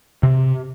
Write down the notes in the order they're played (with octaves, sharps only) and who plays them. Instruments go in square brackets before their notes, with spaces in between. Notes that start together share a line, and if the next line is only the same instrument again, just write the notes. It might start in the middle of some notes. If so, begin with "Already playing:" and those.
[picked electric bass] C3